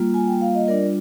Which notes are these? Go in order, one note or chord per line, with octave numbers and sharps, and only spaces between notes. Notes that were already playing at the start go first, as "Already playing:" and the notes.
Already playing: G3 A#3 F4
G#5
G5
F5
D#5
G3 D4 F4 A#4 D5